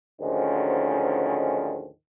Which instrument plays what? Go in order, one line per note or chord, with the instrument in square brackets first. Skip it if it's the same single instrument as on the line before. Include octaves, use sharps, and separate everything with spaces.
[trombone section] D2 G#2 D#3 F3 C#4